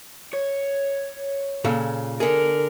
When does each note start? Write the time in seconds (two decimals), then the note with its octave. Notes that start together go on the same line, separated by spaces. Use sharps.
0.33 C#5
1.65 A#2 C#3 A4
2.20 D3 G#4 A#4